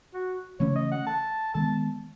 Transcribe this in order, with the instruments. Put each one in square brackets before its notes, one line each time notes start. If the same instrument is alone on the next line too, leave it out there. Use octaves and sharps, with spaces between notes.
[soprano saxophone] F#4
[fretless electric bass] C#3 E3 A3 C#4 [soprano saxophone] C#5
[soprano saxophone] D#5
F#5
A5
[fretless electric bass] D#3 G#3 B3 [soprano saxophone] A5